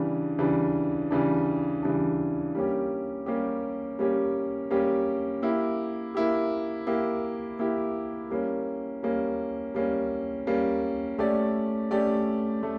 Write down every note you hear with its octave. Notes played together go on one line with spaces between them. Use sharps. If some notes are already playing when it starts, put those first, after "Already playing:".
Already playing: C#3 E3 G3 D4
C#3 E3 G3 D4
C#3 E3 G3 D4
C#3 E3 G3 D4
G3 A#3 C#4 G4
G3 A#3 C#4 G4
G3 A#3 C#4 G4
G3 A#3 C#4 G4
A#3 E4 G4
A#3 E4 G4
A#3 E4 G4
A#3 E4 G4
G3 A#3 C#4
G3 A#3 C#4
G3 A#3 C#4
G3 A#3 C#4
A3 C#4 G4 D5
A3 C#4 G4 D5
A3